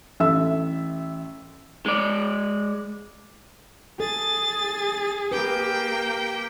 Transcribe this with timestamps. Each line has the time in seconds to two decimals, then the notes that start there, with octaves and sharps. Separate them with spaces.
0.20 A1 A4 E5 E6
1.86 G#3 D5
4.00 G#4 A4 A6
5.32 A#3 G4 B4 G5